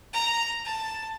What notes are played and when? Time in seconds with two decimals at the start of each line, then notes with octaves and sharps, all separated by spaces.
0.13 A#5
0.65 A5